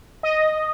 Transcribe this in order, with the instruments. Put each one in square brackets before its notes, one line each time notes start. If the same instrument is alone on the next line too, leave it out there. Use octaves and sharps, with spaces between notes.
[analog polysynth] D#5